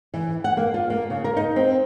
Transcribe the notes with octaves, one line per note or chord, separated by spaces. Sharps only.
E3
F#5
A#3
F4
A#3
C#3
A#4
D#4
C4